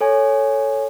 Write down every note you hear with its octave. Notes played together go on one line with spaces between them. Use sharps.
A4 C#5 G#5